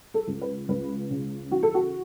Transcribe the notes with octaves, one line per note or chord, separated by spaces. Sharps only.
A4
C#2
B4
C#2 B4
C#3
E3 F#4
A4
F#4